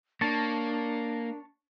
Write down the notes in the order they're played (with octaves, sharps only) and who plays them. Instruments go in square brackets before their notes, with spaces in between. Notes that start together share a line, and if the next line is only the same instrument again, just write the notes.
[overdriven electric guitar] A#3 [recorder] D4 [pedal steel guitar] C#5 A5